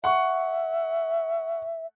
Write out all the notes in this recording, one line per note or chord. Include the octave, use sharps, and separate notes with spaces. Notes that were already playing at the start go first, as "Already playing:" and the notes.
E5 F#5 C#6